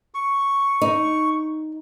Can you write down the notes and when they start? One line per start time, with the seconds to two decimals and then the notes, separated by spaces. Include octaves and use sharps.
0.14 C#6
0.82 D#4